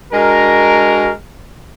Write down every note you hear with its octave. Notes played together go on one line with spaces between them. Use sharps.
G#3 D4 F#4 A#4